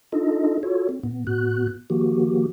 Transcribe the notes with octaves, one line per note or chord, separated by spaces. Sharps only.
D4 D#4 F4 A4 D#5
F4 F#4 A4 C#5
C4
A#2 B3
A2 B3 F#4 F#6
D#3 F3 A#3 F#4 G4